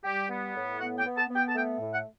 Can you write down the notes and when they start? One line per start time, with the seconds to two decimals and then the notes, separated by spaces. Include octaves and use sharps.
0.03 G3 G4
0.29 B3
0.54 A2
0.79 B3 F#5
0.98 G5
1.04 B3
1.16 A5
1.29 B3
1.35 G5
1.48 A5
1.54 A3 G5
1.80 A2
1.92 F#5